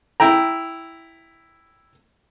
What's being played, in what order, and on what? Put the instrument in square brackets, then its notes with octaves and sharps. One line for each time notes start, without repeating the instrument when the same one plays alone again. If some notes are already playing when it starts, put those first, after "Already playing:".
[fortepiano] E4 G5 A#5